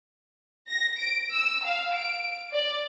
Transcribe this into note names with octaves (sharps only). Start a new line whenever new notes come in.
A#6
D7
E6
F5
D7
D5